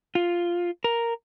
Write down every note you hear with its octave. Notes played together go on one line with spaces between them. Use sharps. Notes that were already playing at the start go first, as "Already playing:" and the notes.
F4
A#4